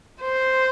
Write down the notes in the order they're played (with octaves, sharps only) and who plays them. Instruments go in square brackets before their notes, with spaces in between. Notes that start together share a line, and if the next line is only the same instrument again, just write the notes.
[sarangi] C5